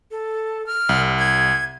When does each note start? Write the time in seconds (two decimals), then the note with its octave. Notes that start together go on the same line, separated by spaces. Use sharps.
0.11 A4
0.66 F6
0.89 C2
1.18 G#6